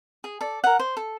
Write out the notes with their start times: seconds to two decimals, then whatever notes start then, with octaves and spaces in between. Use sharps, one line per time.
0.24 G#4
0.41 A4 D5
0.64 A#4 F#5
0.79 C5
0.97 A4